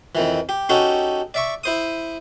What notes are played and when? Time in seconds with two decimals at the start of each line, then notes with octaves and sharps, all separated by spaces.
0.15 F2 D#3 E3
0.49 G4
0.69 C#4 D#4 F#4 G4 A4
1.34 D5 E5 C#6
1.64 E4 C5 D#6